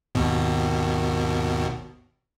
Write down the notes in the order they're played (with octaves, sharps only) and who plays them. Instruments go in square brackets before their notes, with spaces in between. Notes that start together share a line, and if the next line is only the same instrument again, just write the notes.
[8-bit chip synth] G#1 D#2 B2